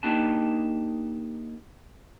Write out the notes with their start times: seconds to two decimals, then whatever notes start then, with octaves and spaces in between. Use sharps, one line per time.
0.03 A#3 D4 D#4 G4 F#5 A5